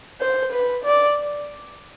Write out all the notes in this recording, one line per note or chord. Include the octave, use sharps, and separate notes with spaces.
C5
B4
D5